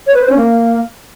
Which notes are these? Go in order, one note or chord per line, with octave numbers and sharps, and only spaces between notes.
C#5
B4
C5
C#4
A#3